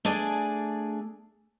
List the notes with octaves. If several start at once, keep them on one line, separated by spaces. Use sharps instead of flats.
A3 D4 G#4 D5 G#5